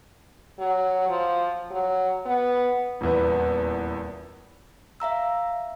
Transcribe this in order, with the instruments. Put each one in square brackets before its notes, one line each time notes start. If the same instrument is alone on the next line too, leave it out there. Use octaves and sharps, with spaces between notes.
[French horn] F#3
F3
F#3
B3
[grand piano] D#1 E2 B3
[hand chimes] E5 F5 A#5 E6